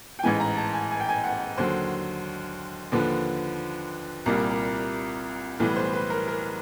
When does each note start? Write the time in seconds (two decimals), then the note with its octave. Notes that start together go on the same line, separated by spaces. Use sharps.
0.19 G5
0.23 A1 G#2 E3 G#5
0.40 A#5
0.57 A5
0.73 G#5
0.91 G#5
1.00 G5
1.09 G#5
1.24 F#5
1.57 D#2 D3 F#3 C5
2.92 D#2 D3 F3 B4
4.26 C2 A#2 G3 A#4
4.51 A#4
5.60 B1 A2 E3 G3 B4
5.76 C5
5.93 B4
6.10 A#4
6.28 A#4